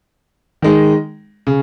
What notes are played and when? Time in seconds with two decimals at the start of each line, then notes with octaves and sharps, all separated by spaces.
0.62 D#3 G#3 D#4
1.47 C#3